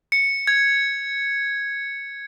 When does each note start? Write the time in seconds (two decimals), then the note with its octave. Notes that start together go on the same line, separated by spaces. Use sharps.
0.12 C#7
0.47 G#6